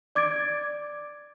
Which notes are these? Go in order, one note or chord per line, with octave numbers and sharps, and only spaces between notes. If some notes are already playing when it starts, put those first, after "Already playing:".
D5 D6 G#6 A6 D7